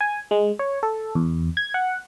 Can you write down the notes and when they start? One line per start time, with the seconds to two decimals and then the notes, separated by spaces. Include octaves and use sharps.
0.01 G#5
0.31 G#3
0.59 C#5
0.83 A4
1.15 E2
1.57 G#6
1.74 F#5